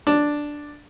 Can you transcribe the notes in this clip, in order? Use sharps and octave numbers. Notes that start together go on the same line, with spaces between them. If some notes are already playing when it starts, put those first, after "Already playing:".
D4